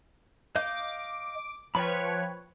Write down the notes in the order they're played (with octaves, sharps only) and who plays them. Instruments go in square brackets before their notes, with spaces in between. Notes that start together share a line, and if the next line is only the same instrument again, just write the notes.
[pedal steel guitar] D#5 F5 G6 [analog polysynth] D6
[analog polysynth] F3 B4 C#5 [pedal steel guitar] G5 B5